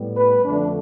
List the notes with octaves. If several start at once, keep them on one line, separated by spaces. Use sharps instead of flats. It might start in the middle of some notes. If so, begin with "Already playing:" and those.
Already playing: A2 G3 B3
B4
F2 D3 A3 D4